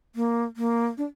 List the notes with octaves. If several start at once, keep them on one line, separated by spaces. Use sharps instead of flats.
A#3
A#3
D4